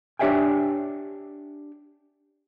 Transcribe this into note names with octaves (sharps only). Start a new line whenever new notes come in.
D4 G4 C#5 E5 G5 G#5